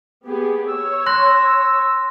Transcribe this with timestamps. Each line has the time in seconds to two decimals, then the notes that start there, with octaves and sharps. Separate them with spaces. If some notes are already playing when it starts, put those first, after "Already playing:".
0.25 B3 G4 G#4
0.68 C#5 E6
1.06 C6 F#6 A#6